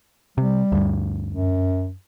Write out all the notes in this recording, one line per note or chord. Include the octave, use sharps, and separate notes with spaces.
C3 G3
D2 G2
F#2